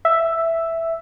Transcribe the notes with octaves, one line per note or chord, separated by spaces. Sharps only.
E5